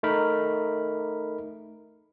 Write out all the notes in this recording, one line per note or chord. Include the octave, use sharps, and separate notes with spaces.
A3 D#4 A#4 B5